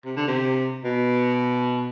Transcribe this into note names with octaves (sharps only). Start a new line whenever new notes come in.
C3
D3
C3
B2